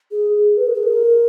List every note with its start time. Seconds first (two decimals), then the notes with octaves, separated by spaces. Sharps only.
0.11 G#4
0.57 B4
0.67 A#4
0.74 G#4
0.83 A#4